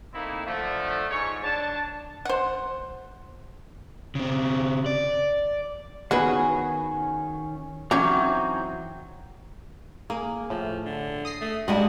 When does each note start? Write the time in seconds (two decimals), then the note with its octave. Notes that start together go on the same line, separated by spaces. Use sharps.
0.14 A3 A#3 C4 D#4 E4
0.46 D3 F3 A3
1.10 G#2 C#5
1.43 D4 A5
2.25 C5 F#5
4.15 C#3 C4
4.86 D5
6.11 D#3 B3 C#4 F#4 G#4 B4
7.91 E3 F#3 C4 C#4 D#4 A#5
10.10 A#3 G#4
10.50 A2 F3
10.86 D3
11.25 D#6 A#6 C7
11.41 A3
11.68 G2 G3 G#3 D4 F#4 D#5